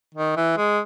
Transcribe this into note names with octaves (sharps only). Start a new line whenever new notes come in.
D#3
E3
G#3